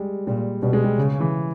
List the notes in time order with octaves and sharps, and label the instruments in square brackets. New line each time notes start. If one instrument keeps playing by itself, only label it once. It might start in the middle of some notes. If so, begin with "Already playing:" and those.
Already playing: [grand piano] G3 G#3
[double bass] A#2 [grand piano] G3
[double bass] B2 [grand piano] G3
[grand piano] G#3
G3
[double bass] C#3
[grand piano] E3